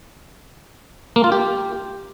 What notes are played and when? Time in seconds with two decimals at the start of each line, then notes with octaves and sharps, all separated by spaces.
1.16 A#3
1.24 F4
1.32 G4